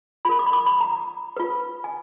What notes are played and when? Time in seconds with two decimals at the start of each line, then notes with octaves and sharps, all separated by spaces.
0.25 F4 A#4 B5
0.39 D6
0.46 B5
0.53 D6
0.66 B5
0.81 A#5
1.37 F4 B4
1.84 G#5